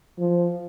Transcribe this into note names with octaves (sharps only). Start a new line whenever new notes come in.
F3